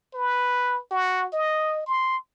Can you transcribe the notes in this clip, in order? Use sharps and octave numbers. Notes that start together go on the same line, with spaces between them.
B4
F#4
D#5
C6